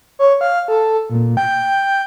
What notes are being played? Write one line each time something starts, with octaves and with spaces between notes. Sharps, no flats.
C#5
F5
A4
A#2
G5